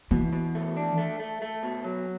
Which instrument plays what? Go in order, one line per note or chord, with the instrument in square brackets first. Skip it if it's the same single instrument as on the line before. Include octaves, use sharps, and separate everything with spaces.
[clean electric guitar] B2 [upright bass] E3
[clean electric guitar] B2
A3
D4
A3
A3
A3
B2
F#3